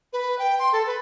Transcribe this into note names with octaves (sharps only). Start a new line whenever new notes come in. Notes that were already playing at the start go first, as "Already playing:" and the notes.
B4
G5
C6
A4
B4